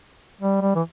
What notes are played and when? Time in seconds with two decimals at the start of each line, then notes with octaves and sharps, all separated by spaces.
0.41 G3
0.61 G3
0.75 E3